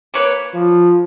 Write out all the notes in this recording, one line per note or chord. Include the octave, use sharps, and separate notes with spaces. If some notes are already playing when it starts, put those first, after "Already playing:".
A#3 B4 C#5
F3